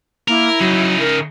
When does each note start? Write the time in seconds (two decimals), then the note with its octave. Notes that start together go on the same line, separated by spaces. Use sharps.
0.28 A#3 E4 A#4
0.60 C#3 F#3 D#4
1.00 A#4